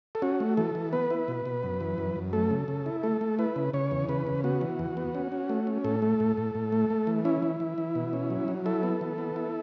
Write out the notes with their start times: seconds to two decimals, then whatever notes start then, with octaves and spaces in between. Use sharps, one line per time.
0.15 A4
0.22 C#4 F#4
0.40 A3
0.57 E3 A4
0.75 E3
0.93 B3 B4
1.10 E4
1.28 B2
1.46 B2
1.63 F#2
1.81 E3
1.98 F#2
2.16 F#2
2.33 A3 A4
2.50 C#3
2.68 C#3
2.86 E4
3.03 A3 A4
3.21 A3
3.39 E4 B4
3.56 C#3
3.73 C#3 C#5
3.91 E2
4.09 C#3 B4
4.27 C#3
4.44 B3 F#4
4.61 E3
4.79 E2
4.97 B3
5.15 C#4
5.32 C#4
5.49 A3
5.67 C#4
5.84 A2 A4
6.02 A3
6.20 A2
6.37 A2
6.55 A2
6.72 A3
6.90 A3
7.07 E3
7.25 C#4 E4
7.42 E3
7.60 E3
7.78 E3
7.95 B2
8.13 C#4
8.30 F#3
8.48 F#3
8.66 E4 A4
8.83 B3
9.01 E3
9.18 B3
9.36 E4